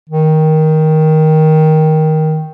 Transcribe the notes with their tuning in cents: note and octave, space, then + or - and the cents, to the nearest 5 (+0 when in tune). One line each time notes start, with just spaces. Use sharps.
D#3 +10